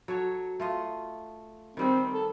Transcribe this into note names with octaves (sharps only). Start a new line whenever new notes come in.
F#3 A4 C#5
A3 F4 D#5
D#3 G3 C4 D#4
A4